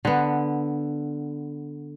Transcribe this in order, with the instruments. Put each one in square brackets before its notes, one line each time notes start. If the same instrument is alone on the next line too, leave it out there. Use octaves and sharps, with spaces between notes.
[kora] D3 B3